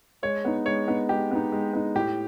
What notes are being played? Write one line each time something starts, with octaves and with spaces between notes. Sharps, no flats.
G#3 C#5
B3 D#4
G#3 C#5
B3 D#4
G#3 G4
B3 D#4
G#3
B3 D#4
A2 G4